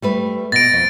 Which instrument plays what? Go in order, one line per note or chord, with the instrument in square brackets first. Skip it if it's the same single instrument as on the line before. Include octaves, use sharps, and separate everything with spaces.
[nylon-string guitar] G3 A3 B4
[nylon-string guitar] B2 [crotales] A6 A#6 D7
[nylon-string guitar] F2